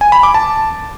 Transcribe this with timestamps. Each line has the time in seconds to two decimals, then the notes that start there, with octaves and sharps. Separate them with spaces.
0.01 G#5
0.12 B5
0.23 D6
0.34 A5